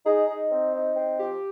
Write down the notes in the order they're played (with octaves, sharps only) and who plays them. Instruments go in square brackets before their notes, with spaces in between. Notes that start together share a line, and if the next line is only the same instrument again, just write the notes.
[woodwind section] D#4 [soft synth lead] G#4
[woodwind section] D#4
C4
D#4
C4
[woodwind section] F3 [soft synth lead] G4